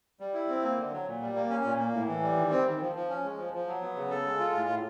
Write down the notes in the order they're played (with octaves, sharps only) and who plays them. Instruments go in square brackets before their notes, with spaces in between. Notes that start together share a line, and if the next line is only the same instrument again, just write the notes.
[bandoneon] G3
E4
C4
A#3
D3
F#3
A#2
G3
A#3
C#4
A#2
A#3
A2
E3
G3
D#3
C4
D#3
F3
F3
C#4
G#3
F3
F3
F#3
B3
C#3
A4
G#3
F4
A2
A2